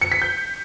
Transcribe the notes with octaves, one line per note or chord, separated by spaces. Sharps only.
C#7
B6
G6